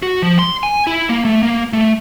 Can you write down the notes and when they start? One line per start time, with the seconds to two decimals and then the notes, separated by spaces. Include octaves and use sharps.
0.02 F#4
0.22 F3
0.39 C6
0.63 G#5
0.87 E4
1.09 A#3
1.25 A3
1.43 A#3
1.73 A3